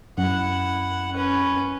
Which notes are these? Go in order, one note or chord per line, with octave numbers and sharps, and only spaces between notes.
F#2 E4 F#5
C#4 B4